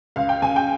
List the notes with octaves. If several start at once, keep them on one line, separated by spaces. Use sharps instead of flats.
C#2 F5
G5
C#3 G#5
G5